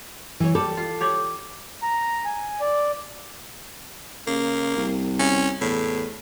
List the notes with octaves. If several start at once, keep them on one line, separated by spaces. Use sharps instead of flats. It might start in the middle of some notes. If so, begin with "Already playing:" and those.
E3 C#5
G3 A4
F4
G4 C#5 D5
A#5
G#5
D5
C#3 A#3
C2
C#4
E2 A2